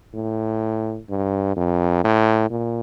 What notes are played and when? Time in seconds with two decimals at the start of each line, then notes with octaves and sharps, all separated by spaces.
0.14 A2
1.09 G2
1.56 F2
2.04 A2
2.50 A#2